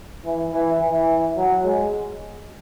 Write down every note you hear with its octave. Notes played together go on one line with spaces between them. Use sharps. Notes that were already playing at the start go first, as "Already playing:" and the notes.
E3
E3
E3
F#3
G#3